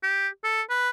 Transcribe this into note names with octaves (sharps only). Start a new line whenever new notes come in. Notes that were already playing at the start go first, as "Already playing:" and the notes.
G4
A4
B4